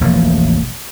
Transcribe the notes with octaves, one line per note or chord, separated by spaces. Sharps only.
E1 A1 F3 A#3